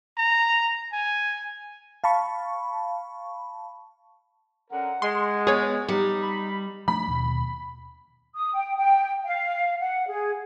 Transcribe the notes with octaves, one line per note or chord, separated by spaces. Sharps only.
A#5
G#5
F5 A5 B5 C#6
D3 C#4 A#4 F#5
G#3 C6
B3 G#4 C#5
G3 D#4
B5
F3 A3 D4 B5
D#2 B2
D#6
G5
G5
F5
F#5
G#4